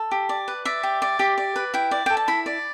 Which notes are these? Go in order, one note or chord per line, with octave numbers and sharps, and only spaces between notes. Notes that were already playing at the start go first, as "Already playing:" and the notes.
Already playing: A4
G4
D5
B4
D5 E5
G4
D5
G4
D5
B4
E4 G5
D5
A4 G5
A5
E4 B5
D5